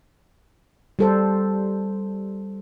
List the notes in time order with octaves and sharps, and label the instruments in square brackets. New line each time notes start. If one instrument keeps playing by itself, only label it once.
[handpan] G3 A4 C5